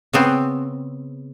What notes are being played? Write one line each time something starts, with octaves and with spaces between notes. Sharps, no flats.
C#3 B3 C4